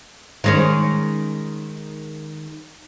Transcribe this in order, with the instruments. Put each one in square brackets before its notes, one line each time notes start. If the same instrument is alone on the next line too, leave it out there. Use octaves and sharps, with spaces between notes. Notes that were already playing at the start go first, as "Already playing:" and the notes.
[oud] D#3 G#3 C#4